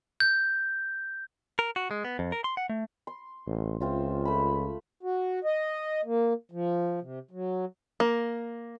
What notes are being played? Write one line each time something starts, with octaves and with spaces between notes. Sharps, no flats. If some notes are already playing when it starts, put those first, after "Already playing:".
G6
A#4
F#4
G#3
B3
F2
A#4
C6
F#5
A3
C6
A1
C#2 C4 F4 E5
A3 B5
F#4
D#5
A#3
F3
C3
F#3
A#3